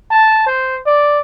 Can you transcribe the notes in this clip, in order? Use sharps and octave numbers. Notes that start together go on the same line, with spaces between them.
A5
C5
D5